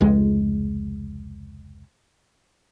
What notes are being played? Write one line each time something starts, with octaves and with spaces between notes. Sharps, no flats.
F1 C#2 G#3